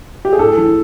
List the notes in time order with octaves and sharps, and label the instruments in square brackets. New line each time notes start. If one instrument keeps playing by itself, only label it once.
[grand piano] G4
G#4
A2 A4
E3